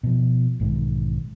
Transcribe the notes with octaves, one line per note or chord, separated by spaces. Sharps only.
B2 F3
B1 G#2 D#3